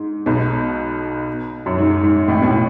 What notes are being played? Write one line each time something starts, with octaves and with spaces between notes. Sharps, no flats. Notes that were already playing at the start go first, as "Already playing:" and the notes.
Already playing: G#2
B1 B2
F#2
G#2
G#2
A1 A2
B2
A2